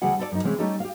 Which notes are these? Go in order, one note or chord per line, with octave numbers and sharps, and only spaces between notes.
D2 C#3 E3 G3 G#4 F#5
A4 B4 D5
F#2 D#4
C3 E3 G#3 C4 C#4
G3 A3 C#4 D#4 G4 A4
G4 F5